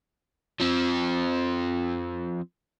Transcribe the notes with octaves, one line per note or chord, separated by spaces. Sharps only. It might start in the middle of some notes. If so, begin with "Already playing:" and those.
F3 C4